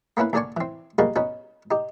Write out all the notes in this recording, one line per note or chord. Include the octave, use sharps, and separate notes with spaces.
A#3 B3 C#4 E4 B4
D#2 D3 D4 D5 G#5 C#6
E3 C4
G3 A#3 D#4 F#4 G#4 A#4
B3 C#4 D#4 F#4
D#4 G4